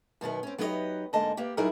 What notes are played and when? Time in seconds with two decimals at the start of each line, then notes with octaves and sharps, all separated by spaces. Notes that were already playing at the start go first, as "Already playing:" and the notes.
0.21 F#2 B2 D#3 B3
0.43 C4 C#4
0.58 F#3 B3 D#4 G4 A4 D#5
1.13 G#2 D3 A#3 G#4 D#5 A5
1.37 A#3 B3 G4
1.57 F#3 G3 D#4 E4 G#4 A#4